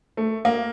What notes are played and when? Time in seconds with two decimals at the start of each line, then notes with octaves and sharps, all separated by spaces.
0.17 A3
0.45 A#3